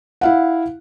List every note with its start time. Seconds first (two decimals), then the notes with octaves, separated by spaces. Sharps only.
0.21 E4 F5 F#5